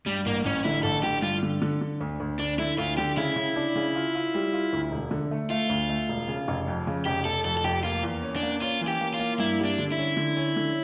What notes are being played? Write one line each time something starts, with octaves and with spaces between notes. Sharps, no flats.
G2 G3
A1 A#3
A1 C#4
D3 E4
A1 A4
D3 G4
G2 F4
D3
D3
D3
D2
D2
D2 D4
D3 E4
D2 F4
D3 G4
C#3 E4
C#3
D4
C#3
F4
F4
G3
F4
D2
E1
D3
A3
A3 F4
D2
A3
E1
C#3
F1
F2
C#3
F1 G4
F1 A4
F2 A4
A4
F1 G4
A#3 F4
E2
C#4
D4
A#3
C#4 F4
E3
G4
A#3
F4
A#3
G2 E4
G3
D4
D3
E4
C#4
D3
C#4
D3